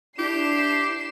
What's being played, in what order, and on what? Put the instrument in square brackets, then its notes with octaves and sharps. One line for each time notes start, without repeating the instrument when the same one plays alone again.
[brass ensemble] D4 [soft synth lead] E4 [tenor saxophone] G4 [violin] C7 E7